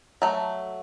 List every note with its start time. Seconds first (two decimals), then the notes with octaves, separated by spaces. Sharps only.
0.22 F#3 A3